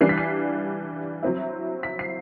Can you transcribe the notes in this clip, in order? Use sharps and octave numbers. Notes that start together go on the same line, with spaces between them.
E3 G3 D4 C7
B6
C7
F#3 C4 E4
B6
C7